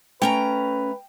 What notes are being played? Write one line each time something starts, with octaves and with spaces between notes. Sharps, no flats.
A3 C#4 B4 G5 A#5